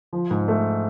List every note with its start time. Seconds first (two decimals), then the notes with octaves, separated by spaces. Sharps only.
0.13 F3
0.31 G#2
0.48 A3